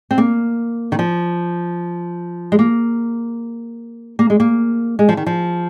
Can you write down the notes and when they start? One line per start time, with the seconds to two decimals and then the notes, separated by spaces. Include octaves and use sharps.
0.11 C4
0.18 A#3
0.92 D#3
0.99 F3
2.52 G#3
2.59 A#3
4.19 A#3
4.30 G#3
4.40 A#3
4.99 G#3
5.09 F3
5.17 D#3
5.26 F3